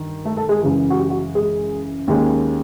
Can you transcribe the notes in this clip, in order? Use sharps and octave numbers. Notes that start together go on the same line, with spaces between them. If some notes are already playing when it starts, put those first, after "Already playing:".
Already playing: G2 D#3
A3 A4
A3 A4
G#3 G#4
F#2 C#3 E3 G#3
F#4
G4
F#4
G#3 G#4
D#2 D#3 G#3 C#4